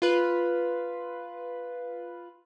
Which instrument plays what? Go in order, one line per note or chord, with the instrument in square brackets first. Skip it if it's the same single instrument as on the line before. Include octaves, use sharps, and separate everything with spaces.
[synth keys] F4 B4